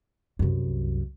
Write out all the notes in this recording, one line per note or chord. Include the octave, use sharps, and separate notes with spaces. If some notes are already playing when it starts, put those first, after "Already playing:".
C2 F#2